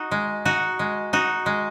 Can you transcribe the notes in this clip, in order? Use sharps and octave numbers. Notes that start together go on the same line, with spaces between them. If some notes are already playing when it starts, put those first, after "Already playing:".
Already playing: D#4 F#4
G#3
D#4 F#4
G#3
D#4 F#4
G#3